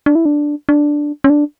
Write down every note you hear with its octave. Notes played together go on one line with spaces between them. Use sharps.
D4
E4
D4
D4
C#4
D4